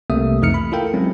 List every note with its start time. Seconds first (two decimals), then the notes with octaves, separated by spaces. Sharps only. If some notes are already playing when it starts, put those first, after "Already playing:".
0.10 C2 C3 A3 A#3 E5 D#6
0.41 F2 E3 A3 D#4 F6 C#7
0.54 B5
0.72 E4 F4 A4 A#4 F5 G5
0.94 F#3 G#3 C4 C#4 E4